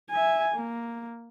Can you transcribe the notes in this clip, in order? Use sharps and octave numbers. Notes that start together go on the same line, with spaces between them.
E5 G#5
A#3